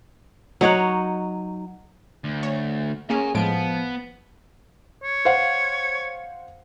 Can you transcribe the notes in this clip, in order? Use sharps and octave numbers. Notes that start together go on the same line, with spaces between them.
F#3 D#4 C#5 F#5
D2
C#5
A#3 C#4 G#4 G#5 A#5
A2 F3 G#3 B3 D7
C#5
C5 F5 F#5